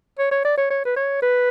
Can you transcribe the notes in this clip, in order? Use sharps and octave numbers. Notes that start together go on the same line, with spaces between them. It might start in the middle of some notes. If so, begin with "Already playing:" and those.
C#5
C#5
D5
C#5
C#5
B4
C#5
B4